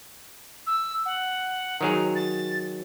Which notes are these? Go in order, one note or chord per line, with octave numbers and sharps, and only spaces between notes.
E6
F#5
D#3 F#3 G#4 A#5
A6